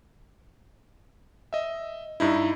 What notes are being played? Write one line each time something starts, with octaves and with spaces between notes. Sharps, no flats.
D#5 E5
G2 D#4 E4